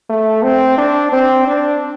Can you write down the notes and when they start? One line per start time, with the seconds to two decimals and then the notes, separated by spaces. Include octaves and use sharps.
0.09 A3
0.43 C4
0.78 D4
1.12 C4
1.47 D4